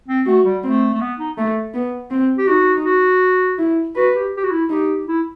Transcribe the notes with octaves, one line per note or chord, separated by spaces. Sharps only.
C4
A3 F#4
G3
A3 C4
A3
B3
D#4
A3
B3
C4
G4
D#4 F#4
F#4
E4
F#4 B4
G4
G4
F#4
E4
D#4 G4
E4